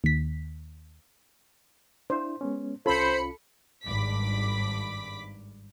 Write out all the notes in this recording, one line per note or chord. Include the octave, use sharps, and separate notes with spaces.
D#2 B6
D4 E4 C5
G#3 B3 C#4
C2 C#4 F4 A4 C5 B5 C#7
G#1 G2 B5 D6 B6